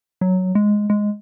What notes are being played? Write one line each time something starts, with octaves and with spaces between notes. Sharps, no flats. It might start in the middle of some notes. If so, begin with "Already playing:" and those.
F#3
G#3
G#3